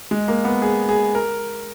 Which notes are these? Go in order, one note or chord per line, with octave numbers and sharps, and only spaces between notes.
G#3
A#3
B3
G#4
G#4
A#4